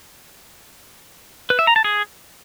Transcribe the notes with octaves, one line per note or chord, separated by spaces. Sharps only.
B4
E5
A#5
A5
G#4